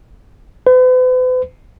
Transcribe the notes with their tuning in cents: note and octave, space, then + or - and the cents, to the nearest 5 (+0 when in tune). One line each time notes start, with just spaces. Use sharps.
B4 +45